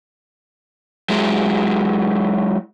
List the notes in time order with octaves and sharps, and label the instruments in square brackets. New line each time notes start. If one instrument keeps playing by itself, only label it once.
[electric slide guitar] F#3 G#3 E4